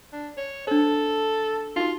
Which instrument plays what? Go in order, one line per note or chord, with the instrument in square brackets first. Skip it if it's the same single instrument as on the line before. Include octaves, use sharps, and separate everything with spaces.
[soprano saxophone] D4
C#5
[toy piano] D4 C5 [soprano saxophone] A4
[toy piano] D#4 F#4 [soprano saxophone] F4